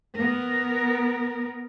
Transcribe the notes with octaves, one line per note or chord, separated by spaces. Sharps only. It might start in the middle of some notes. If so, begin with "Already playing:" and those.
B3 A#4